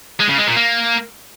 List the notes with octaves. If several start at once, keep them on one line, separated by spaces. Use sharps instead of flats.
G#3
C#3
G#3
A#2
A#3